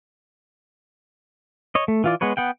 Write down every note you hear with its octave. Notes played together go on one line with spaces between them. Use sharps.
C#5 D#5
A3
E3 F4 D5
G#3 B3 B4 C#5
B3 F#5 G5